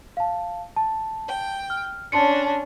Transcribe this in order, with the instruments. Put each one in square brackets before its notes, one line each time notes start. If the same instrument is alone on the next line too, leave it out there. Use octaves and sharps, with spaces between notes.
[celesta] F5 A5
A5
[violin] G5
[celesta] F6
[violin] C#4 D4 [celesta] A5 C6 C#7